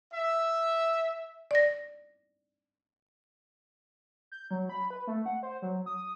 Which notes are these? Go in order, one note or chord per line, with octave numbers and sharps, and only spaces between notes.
E5
D5 A#6
G6
F#3
B5
B4
A3
F#5
C5
F#3
D#6